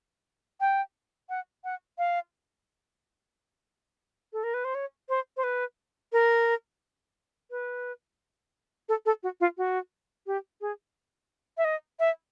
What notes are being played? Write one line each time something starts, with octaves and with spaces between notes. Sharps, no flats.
G5
F#5
F#5
F5
A4
A#4
B4
C5
C#5
C5
C5
B4
A#4
B4
A4
A4
F#4
F4
F#4
G4
G#4
E5
D#5
E5